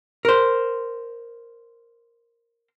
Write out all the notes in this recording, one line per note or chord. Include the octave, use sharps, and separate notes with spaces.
A#4 C5